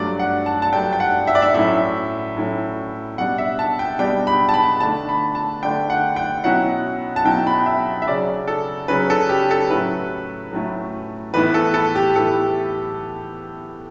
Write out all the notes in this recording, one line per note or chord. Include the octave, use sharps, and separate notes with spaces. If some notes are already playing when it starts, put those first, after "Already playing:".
Already playing: G2 F#3 A3 D4 D5
F#5
A5
A5
G2 F#3 A3 D4 G5
G5
F#5
E5
D5
E5
A2 F#3 C#4 E4 E5
A2 F#3 C#4 E4
B2 G3 D4 F#5
E5
A5
G5
B2 G3 D4 G5
B5
A5
B5
D3 A3 D4 A5
B5
A5
D3 A3 D4 G5
F#5
G5
B2 F#3 C#4 E4 F#5
A5
B2 F#3 C#4 E4 G5
B5
E5
E5
C#3 F#3 C#4 D5
A4
C#3 F#3 C#4 B4
A4
G4
A4
A2 F#3 A3 C#4 E4 B4
A2 F#3 A3 C#4 E4
A2 E3 B3 E4 B4
A4
A4
G4
A2 E3 B3 E4 A4